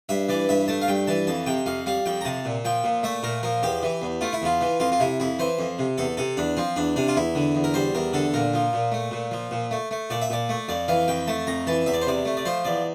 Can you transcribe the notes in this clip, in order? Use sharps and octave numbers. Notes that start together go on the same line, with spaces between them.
G2 E5
E3 D5
G2 E5
A3 A5
F5
G2 G5
E3 A5
F2 A5
C3 G5
F2 F5
G3 F5
F2 G5
A#5
C3 A5
A#2
F3 G5
A#2
A3 E5
A#2 A#4
F3 A#4
E2 G4
E3
E2
A3 F4
E4
E2 F4
E3
F2 F4
F4
C3 E4
F2 E4
E3 C5
F2
C3
E2 A4
C3 A4
E2 D4
F3 C4
E2 D4
C3 D4
F4
E2 E4
D3
E2
A#4
G3 C5
E2 A#4
D3 A4
A#2 A#4
F3
A#2
A3
A#2
F3
A#2
A3
A3
A#2 D5
E5
A#2 D5
A3
F2 D5
E3 F5
F2 G5
A3 A5
F2 A#5
E3 A5
E2 E5
D5
C5
C3 D5
A3
D5
F3 C5
E2 D5